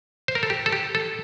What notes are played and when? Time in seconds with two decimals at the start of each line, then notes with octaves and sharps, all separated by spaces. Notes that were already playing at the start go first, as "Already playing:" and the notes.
0.28 C5
0.35 A#4
0.43 A4
0.50 G4
0.66 A4
0.72 G4
0.95 A4